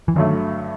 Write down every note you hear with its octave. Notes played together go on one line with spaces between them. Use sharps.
E3
G2 D3 D#3 F#3 A3